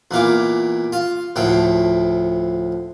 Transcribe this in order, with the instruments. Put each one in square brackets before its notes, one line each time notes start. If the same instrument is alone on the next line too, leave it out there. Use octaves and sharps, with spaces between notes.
[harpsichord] E2 A#2 F5 D6
F4
D2 A2 F3 G5